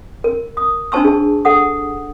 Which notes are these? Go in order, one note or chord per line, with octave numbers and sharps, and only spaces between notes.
A#4
D#6
D4 D#4 C5 A5 C#6 E6
G#4 A5
A4 F#5 D#6